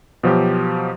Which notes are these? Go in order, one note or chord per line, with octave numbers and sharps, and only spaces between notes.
B2 F3 F#3 G4